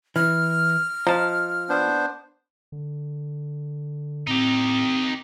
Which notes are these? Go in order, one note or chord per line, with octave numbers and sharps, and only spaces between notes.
E3 F6
F3 D#5 A5 A#5
B3 D4 C5
D3
A2 C4 D#4 G4